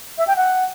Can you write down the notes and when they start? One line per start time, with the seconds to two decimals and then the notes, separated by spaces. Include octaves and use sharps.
0.18 E5
0.27 G5
0.37 F#5